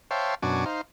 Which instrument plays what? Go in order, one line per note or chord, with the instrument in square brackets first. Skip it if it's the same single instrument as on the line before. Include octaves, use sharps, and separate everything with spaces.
[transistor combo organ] C5 C#5 E5 F5 G5 A5
F#2 B2 D4 F#4 G#5 D6
D#4 C5 F5